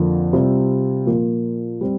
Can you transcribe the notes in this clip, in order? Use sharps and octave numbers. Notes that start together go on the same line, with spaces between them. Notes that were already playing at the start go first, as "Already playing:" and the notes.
Already playing: F2 D3 A#3 F4
C3 G3 C4 F4
A#2 F3 A#3 F4
G3 C4